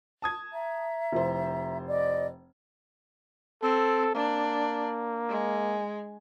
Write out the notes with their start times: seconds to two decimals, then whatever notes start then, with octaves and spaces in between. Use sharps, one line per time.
0.22 A5 D#6 G#6
0.52 E5 A#5
1.12 F1 E4 C5
1.87 D5 D#5
3.63 C4 A4
4.15 A#3 D4
5.29 G#3